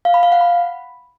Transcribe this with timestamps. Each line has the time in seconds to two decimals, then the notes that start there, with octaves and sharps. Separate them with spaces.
0.05 F5
0.14 B5
0.23 F5
0.32 F#5
0.41 B5